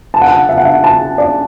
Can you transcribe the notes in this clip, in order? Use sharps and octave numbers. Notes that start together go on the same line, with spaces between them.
A5
F#5
A5
E5
F#5
E5
A5
D5